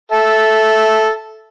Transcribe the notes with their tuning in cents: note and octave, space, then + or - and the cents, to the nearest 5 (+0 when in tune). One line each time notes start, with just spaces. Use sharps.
A4 -10 E5 +0